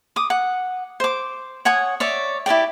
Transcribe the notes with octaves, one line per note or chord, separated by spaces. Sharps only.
D6 D#6
F#5
C5 D6
C#5 F#5 G#5 D#6
C#5 D5 E5
E4 G4 D5 G5